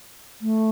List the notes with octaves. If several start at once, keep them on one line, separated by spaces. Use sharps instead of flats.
A3